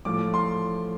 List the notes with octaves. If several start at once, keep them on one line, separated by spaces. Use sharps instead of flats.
A2 F3 A3 D6
C6